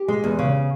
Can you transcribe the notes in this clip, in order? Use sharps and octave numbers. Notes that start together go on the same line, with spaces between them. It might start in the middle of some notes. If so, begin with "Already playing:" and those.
Already playing: G4
G#3
E2
C#3